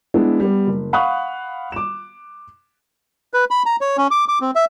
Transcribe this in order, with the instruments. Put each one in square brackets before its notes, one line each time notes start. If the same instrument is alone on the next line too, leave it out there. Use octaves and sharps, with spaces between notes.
[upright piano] G#3 B3 D4 E4
G3 B3
F#1
F5 F#5 B5 C#6 D#6 F#6
D6 E7
[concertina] B4
B5
A#5
C#5
C#4
D6
D6
C4
E5